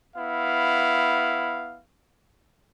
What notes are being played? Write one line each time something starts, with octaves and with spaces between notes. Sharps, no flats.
B3 E4 F5